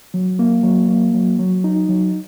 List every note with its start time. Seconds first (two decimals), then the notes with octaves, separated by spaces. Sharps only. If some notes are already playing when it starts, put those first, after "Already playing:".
0.14 F#3
0.39 A#3
0.63 F#3
0.89 A#3
1.14 F#3
1.39 F#3
1.64 D#4
1.89 F#3